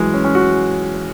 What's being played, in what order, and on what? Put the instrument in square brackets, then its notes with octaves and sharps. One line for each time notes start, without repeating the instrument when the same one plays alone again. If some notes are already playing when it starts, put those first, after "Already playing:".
Already playing: [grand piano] E3 F#3 G#3
C#4
C#4
F#4